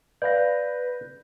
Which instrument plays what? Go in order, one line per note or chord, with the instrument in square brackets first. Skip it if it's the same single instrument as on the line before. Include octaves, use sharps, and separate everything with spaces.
[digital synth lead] B4 [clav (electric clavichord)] D5 F5 [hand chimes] G6 A#6